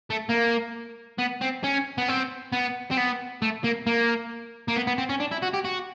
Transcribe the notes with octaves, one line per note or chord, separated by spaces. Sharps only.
A3
A#3
B3
C4
C#4
B3
C4
B3
C4
B3
A3
A#3
A#3
A#3
B3
B3
C4
C#4
D4
E4
F#4
G4
F#4